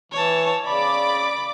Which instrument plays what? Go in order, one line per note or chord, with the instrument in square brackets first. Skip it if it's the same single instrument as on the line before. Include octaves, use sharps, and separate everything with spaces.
[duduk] E3 [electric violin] C#5 A5
[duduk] C#3 [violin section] D5 D6 [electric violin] B5